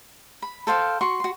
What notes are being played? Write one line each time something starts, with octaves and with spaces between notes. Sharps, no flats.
B5
A4 C5 F5 G5
F#4 C6 C#6
F#4 C6